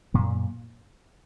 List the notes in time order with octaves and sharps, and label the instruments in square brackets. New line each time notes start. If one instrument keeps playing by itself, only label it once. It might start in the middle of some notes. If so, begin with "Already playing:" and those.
[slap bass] F#2 A#2